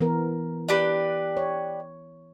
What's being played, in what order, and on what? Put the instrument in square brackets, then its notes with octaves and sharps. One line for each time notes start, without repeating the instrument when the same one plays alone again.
[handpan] E3 B3 A#4
[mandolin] D4 G4 B4
[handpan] C#5